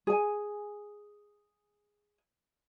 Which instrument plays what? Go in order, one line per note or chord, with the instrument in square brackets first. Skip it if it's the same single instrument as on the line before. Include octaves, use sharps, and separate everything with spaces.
[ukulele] G#4 G#5